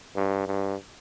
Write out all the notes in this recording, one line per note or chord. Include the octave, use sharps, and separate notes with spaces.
G2
G2